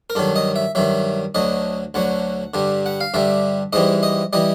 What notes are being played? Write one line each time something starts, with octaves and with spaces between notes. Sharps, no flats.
A#4
G2 D#3 F#3 A4
D#5
E5
G2 D#3 F#3 E5
D2 D3 F#3 D#5
D2 D3 F#3 F#5
G2 D3 G3
F#5
F5
G2 D3 G3 E5
G#2 E3 G3 D#5
D#5
E3 G3 D#5